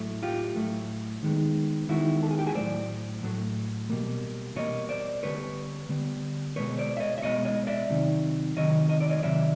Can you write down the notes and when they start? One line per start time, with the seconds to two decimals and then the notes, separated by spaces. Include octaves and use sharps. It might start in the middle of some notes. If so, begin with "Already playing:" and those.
Already playing: A2 F#3 A3
0.23 F4 G4
0.56 A2 F#3 A3
1.23 D#3 G#3 B3
1.89 D#3 G#3 B3 E4 F#4
2.23 A4
2.31 G#4
2.39 G4
2.46 F#4 G#4
2.55 A2 F#3 A3 C5 D5
3.23 A2 F#3 A3
3.90 B2 G3 A#3
4.55 B2 G3 A#3 C#5 D#5
4.89 C5 D5
5.23 D3 G3 B3 B4 C#5
5.89 D3 G3 B3
6.56 B2 G#3 B3 B4 C#5
6.78 C5 D5
6.97 E5
7.00 C#5 D#5
7.18 E5
7.22 B2 G#3 B3 C#5 D#5
7.45 C#5 D#5
7.67 D5 E5
7.90 C3 D#3 F#3
8.56 C3 D#3 F#3 C#5 D#5
8.89 D#5
9.01 D5
9.09 C#5 D#5
9.23 C3 D#3 F#3 D5 E5